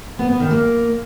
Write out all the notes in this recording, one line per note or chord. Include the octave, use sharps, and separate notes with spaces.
B3
B3
D#3
A#3